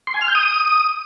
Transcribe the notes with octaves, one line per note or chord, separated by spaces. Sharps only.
C6
G#5
F6
G6
D#6